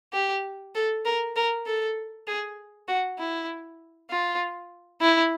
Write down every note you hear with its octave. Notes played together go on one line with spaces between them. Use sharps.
G4
A4
A#4
A#4
A4
G#4
F#4
E4
F4
E4